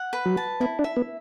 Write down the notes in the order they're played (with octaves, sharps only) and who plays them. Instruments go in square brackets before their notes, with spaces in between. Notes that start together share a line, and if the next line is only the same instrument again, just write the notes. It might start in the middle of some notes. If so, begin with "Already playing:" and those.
Already playing: [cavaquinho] F#5
B4
[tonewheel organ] F#3
[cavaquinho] A5
[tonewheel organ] B3 [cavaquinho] E4
[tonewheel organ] D4
[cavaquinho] E5
[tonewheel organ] B3